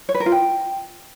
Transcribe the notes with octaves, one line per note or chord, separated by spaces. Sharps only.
C#5
B4
A#4
F4
G5